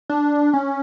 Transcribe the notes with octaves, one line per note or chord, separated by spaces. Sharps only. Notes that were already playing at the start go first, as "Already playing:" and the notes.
D4
C#4